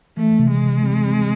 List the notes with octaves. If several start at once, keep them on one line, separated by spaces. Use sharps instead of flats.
E3 A3
C3
G#3
C3
C4
C4